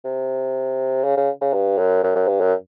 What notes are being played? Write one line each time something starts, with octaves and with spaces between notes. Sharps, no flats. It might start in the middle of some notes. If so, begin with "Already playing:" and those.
C3
C#3
C#3
C#3
G2
F#2
F#2
F#2
G2
F#2